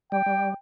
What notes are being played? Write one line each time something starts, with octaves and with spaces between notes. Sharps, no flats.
G3 G5
G3